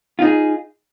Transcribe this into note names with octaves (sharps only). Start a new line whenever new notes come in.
D#4 F4 G#4